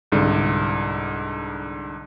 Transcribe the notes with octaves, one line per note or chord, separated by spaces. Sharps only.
C2 G#2 D3